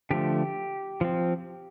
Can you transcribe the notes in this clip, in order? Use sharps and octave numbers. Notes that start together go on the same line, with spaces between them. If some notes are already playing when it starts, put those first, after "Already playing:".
D3 F3 A3 G4
F3 C4